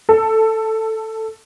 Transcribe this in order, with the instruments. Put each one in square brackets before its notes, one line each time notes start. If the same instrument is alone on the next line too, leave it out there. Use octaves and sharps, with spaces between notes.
[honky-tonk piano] A4